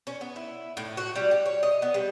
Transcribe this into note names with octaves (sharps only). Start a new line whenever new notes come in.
C#4
B3
E4
A2
F#4
G3
G4
C#5
D#5
B3
G3